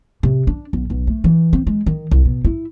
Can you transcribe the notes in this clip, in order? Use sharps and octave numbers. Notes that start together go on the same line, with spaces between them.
C3
D4
B1
B1
A3
E3
C4
G#3
D#3
C2
B2
E4